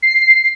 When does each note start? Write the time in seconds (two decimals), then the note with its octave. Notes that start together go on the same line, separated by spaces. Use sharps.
0.02 C7